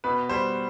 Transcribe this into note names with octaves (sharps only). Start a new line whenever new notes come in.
B2 B4
G3 C5